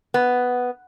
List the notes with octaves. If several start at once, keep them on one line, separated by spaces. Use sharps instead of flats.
B3